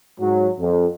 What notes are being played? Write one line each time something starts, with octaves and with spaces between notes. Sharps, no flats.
G#2 F#3
F2